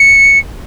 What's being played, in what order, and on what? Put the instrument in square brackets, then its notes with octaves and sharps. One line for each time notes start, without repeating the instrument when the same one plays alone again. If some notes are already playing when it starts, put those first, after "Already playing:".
Already playing: [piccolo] C#7